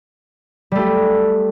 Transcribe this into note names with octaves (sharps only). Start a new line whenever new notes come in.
G3 A3 G4